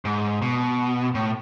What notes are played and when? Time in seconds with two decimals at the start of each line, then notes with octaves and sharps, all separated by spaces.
0.05 G#2
0.42 B2
1.15 A2